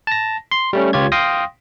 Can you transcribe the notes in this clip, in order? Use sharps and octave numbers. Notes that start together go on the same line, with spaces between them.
A5 A#6
C6
G3 A3 C#4
C#2 F4 G4 C#5 G#6
F5 G5 C6 D#6 A#6